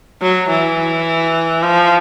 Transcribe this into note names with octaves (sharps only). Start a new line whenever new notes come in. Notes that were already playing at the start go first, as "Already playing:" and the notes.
F#3
E3
F3